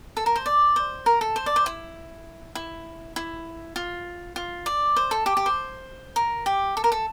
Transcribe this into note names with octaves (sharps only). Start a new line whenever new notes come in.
A4
A#4
C5
D5
C5
A#4
A4
C5
D5
C5
E4
E4
E4
F4
F4
D5
C5
A4
G4
G4
C5
A#4
G4
A4
A#4
A4